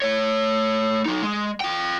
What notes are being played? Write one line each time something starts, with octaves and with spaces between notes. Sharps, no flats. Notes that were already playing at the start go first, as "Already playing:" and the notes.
A3 C#5
F#3 D#4
G#3
F4 G5